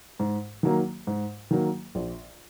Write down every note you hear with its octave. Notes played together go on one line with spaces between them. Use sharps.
G#2
D#3 F#3 A#3
G#2
D#3 F#3 A#3
A#1